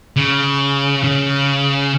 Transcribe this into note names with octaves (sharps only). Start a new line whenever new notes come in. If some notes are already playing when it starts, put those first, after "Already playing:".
C#3
C#3